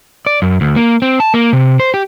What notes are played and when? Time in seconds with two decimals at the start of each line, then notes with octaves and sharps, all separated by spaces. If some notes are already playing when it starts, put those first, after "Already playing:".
0.26 D5
0.42 F#2
0.61 D2
0.76 A#3
1.02 C4
1.20 A5
1.34 A#3
1.53 C3
1.80 C5
1.94 G4